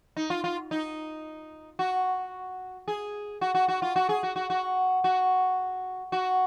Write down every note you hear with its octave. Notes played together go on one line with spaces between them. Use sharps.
D#4
F4
F4
D#4
F#4
G#4
F#4
F#4
F#4
F4
F#4
G#4
F#4
F#4
F#4
F#4
F#4